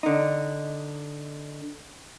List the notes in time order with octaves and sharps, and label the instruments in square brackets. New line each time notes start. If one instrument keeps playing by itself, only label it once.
[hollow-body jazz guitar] D3 D#4